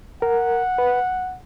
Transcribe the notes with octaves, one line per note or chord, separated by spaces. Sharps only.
A#4 F#5
B4